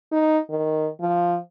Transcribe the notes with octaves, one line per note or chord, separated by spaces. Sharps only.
D#4
D#3
F3